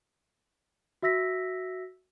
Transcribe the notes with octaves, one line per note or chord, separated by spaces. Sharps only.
F#4 E5 E6 A#6 B6